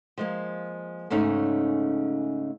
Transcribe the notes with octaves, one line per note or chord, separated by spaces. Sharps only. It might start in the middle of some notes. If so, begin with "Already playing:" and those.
F3 G#3 A#3
G#2 C#3 A3 C#4 D#4